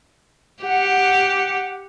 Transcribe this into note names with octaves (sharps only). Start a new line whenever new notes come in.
G4 F#5